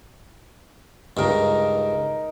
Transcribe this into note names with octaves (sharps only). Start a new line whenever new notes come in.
C#2 G2 D#4 A#4 D#5